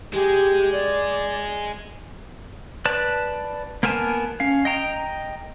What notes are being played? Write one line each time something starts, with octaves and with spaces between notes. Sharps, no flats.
G#3 G4 G#4
D5
B4 D5 A5
A#3 B3 A#4 G#5 A5
C#4 F5
D#5 G5 A#5